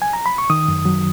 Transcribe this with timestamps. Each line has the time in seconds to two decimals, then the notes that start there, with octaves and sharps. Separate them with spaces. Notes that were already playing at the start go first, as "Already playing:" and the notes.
0.02 G#5
0.13 A#5
0.26 B5
0.38 C#6
0.50 D#3 D#6
0.68 F#2
0.85 F#3